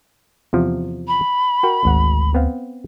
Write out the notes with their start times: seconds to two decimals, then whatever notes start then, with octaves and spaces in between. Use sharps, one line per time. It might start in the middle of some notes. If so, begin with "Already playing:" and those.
0.53 E2 C3 F3
1.08 B5
1.63 F#4 A#4 G5
1.85 G#1 D2 F#5
2.34 B3 C4 F5